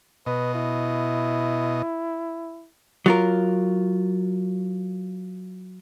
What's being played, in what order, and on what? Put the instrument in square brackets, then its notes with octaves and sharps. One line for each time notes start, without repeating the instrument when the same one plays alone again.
[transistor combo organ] B2 D#5 [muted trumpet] B4
[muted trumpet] E4
[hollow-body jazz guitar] F#3 F4 A#4